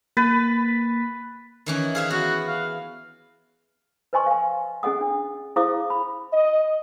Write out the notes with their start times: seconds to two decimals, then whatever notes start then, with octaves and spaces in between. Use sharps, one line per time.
0.17 A#3 B4 A6
1.66 D#3 E3 C#4
1.95 G#4 C5 E5 F5
2.10 B3 F#4
2.48 F5
4.13 B4 C5 D#5 G#5 C6 C#6
4.27 F5 G#5
4.83 C#4 G#4 D#5 F#5 D#6
5.01 D4
5.56 E4 G#4 C5 F5 D6 D#6
5.90 B5
6.33 D#5